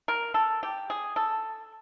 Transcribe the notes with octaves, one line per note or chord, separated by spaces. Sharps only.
A#4
A4
G4
G#4
A4